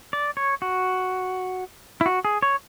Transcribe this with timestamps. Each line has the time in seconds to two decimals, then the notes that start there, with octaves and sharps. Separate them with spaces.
0.13 D5
0.37 C#5
0.62 F#4
2.01 E4
2.06 F#4
2.25 G#4
2.43 C#5